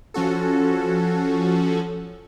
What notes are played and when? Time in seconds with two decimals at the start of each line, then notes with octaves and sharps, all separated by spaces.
0.14 F3 C#4 F#4 A4